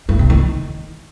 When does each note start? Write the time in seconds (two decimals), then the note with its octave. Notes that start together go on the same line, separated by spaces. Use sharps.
0.09 G2
0.19 C3
0.30 D#3